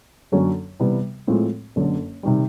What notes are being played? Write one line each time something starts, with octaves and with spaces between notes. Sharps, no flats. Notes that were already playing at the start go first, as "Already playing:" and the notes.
F#2 D3 F#3 A#3 C#4
C3 E3 G3 B3
A2 F3 G#3 C4
F#1 F#2 D3
C3 D#3 G3